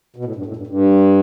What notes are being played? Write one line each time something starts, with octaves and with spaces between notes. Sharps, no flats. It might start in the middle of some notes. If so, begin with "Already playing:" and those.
B2
A2
G2
A2
G2
G2